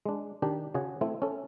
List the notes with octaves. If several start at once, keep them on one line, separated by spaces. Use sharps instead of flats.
G#3 D4
D#3 D4 D#4 G4
C#3 F#4 G#4 C#5
A3 C4 E4
C#4 A4